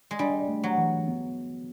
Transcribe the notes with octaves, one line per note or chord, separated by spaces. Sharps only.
G#3
G3 D4
A3
F#3
E3
B3